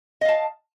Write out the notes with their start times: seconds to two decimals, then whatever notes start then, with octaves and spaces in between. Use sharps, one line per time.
0.21 D#5
0.25 F5
0.29 A5